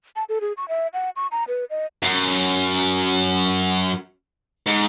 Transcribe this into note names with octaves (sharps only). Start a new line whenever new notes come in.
A5
A4
G#4
C#6
E5
F#5
C#6
A#5
B4
D#5
F#2
G#2